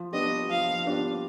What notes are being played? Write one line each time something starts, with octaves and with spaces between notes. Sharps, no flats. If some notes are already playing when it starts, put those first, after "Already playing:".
Already playing: F3
B3 D4 G4 D#5
F3 F5
B3 D4 G4